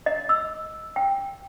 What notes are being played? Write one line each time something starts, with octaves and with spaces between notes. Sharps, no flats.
D#5
E6
G5